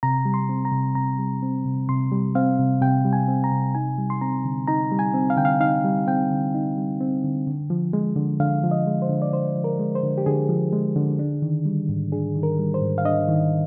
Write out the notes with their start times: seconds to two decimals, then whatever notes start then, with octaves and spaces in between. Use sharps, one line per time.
0.03 C3 A#5
0.25 G3
0.34 C6
0.49 C4
0.65 A#5
0.72 C3
0.95 C3 A#5
1.19 G3
1.42 C4
1.65 C3
1.89 C3 C6
2.12 G3
2.35 C4 F5
2.59 C3
2.81 C3 G5
3.05 G3
3.13 G#5
3.28 C4
3.44 A#5
3.52 C3
3.75 D#4 G#5
3.98 G3
4.10 C6
4.21 C4 A#5
4.45 D3
4.68 D#4 A#5
4.91 G3
4.99 G#5
5.14 C4
5.30 F5
5.37 D3 G5
5.45 F5
5.60 D#4 F5
5.85 G3
6.07 C4 G5
6.31 D3
6.54 D#4
6.77 G3
7.01 C4
7.24 D3
7.47 D3
7.70 F3
7.93 G#3
8.16 D3
8.40 D3 F5
8.63 F3
8.71 D#5
8.87 G#3
9.02 C5
9.09 D3
9.22 D5
9.33 D3 C5
9.56 F3
9.64 A#4
9.79 G#3
9.95 C5
10.03 D3
10.18 G4
10.26 D3 G#4
10.49 F3
10.73 G#3
10.96 D3
11.19 D4
11.42 D#3
11.65 G3
11.89 G#2
12.12 D4 G#4
12.36 D#3
12.43 A#4
12.59 G3
12.74 C5
12.82 G#2
12.98 F5
13.05 D4 D#5
13.28 D#3